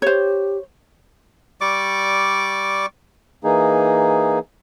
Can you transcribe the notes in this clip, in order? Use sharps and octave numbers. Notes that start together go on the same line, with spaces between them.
G4 C5 C#5
G3 D5 C#6 D6
E3 A#3 D#4 G#4